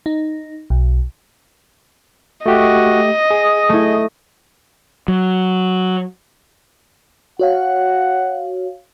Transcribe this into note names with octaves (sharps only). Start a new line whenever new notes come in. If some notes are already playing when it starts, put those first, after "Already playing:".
D#4
B1
A3 F#4 G4 D#5
G#4 D#6
A3 E4
F#3
F#4 C#5 F5 F#5